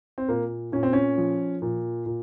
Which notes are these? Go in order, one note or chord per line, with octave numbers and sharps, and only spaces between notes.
C4
A#2 A#3
A#2 C#4
C4
C#4
F3
A#2
A#2